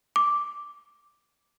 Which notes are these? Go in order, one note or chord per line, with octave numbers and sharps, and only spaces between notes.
D6